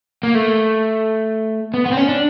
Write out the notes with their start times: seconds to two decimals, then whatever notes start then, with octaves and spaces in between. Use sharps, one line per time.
0.23 A#3
0.35 A3
1.74 B3
1.86 B3
1.92 C4
1.97 C#4
2.09 D4